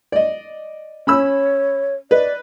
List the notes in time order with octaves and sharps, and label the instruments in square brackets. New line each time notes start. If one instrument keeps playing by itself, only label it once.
[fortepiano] D5 D#5
[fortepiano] C#4 B5 E6 [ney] C#5
[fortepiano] B4 D#5 [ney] D5